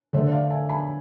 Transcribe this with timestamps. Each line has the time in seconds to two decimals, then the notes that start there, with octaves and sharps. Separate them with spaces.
0.13 D3 A3 D4 C5 E5
0.31 D5 F5
0.50 E5 G#5
0.69 G#5 B5